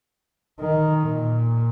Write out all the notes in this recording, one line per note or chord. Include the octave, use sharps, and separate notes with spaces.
D#3
A#2